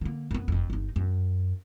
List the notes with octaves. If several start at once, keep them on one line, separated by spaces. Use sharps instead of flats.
D3 A#3
F#2 B3
F#1 F2
G1 D#4
F#2